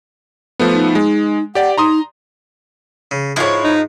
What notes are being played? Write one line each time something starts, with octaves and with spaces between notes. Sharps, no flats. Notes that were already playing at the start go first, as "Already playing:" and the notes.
F3 A3 B3
D#4
G#3
G4 D5 F#5
D#4 A#5 C6 D#6
C#3
G#2 F3 E4 C#5
D#4